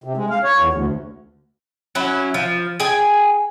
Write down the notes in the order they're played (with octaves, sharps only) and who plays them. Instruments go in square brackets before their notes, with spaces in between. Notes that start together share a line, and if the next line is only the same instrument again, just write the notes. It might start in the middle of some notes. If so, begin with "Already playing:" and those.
[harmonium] C3
G#3
F5
C#5
E2
D2
[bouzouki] F#3 C#4 E4
F3
G#4 G5 G#5